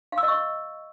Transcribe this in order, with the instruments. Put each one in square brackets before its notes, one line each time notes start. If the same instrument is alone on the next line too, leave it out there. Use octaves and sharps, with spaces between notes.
[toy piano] F5
E6
D#5
C#6